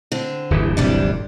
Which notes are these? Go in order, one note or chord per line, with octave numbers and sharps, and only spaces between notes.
D3 C4
D1 G1 E3
C3 G3 D4